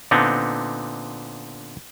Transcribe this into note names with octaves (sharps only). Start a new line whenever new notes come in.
A#2 D3 B3 C4 D#4